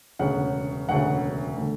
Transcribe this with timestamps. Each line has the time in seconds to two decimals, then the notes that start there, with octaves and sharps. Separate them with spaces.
0.19 E1 D2 C#3 F#5
0.89 E1 D2 C#3 F#5
1.57 D3 A3